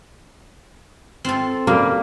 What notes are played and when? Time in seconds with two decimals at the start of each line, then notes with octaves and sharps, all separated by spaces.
1.25 C4 F4 A4
1.67 C#3 G3 A#3